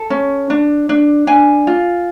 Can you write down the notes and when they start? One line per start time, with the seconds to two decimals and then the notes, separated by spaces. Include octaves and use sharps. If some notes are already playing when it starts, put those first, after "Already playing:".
Already playing: A4
0.10 C#4
0.50 D4
0.89 D4
1.27 D4 G#5
1.67 F4